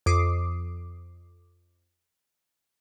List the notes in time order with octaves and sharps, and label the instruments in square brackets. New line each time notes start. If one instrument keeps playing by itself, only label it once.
[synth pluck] F2 D6 D#6 C7